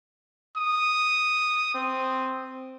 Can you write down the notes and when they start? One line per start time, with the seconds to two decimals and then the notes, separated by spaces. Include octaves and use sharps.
0.57 D#6
1.74 C4